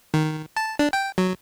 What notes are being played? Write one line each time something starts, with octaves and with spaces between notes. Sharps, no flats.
D#3
A5
D4
G5
F#3